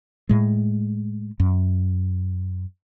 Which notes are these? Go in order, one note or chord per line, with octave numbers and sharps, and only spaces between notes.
A2 G#3
F#2